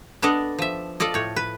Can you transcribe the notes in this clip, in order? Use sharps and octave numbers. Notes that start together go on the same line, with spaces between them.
B3 D4 A4 D5 D#5
F3 E5
F4 A4 D5 D#5
A2 C#5
B4